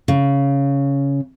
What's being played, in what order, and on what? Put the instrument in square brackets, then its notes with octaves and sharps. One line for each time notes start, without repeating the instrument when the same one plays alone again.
[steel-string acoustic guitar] C#3